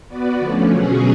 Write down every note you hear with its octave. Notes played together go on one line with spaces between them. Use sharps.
B3 F#4 B4 D5
D3 F3 A3 C#4
B2 F#3 C#4 G#4